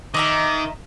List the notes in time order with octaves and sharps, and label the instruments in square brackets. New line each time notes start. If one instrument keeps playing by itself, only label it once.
[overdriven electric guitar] D#3 [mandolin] D#5 E5 A#5 [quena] D6